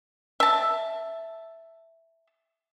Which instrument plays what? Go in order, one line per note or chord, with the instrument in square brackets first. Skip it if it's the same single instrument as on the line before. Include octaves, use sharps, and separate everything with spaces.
[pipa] E5 A5